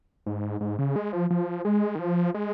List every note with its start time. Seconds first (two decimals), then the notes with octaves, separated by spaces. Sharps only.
0.26 G#2
0.61 G#2
0.79 C#3
0.96 G#3
1.13 F3
1.30 F3
1.65 G#3
1.95 D#3
1.99 F3
2.34 G#3